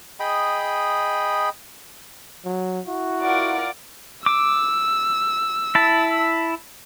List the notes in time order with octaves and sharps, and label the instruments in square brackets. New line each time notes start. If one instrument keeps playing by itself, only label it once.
[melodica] G#4 D#5 G5 B5
[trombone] F#3
[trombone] E4 [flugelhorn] F#4
[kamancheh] F4 F#5 [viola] A#4 D5
[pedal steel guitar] D6 [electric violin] E6
[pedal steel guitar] E4 A5